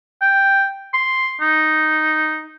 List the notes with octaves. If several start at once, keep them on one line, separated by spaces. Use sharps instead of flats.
G5
C6
D#4